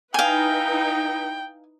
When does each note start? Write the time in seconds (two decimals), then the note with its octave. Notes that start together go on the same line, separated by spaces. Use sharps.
0.14 D#4 E4 B4 F5 G5 G#5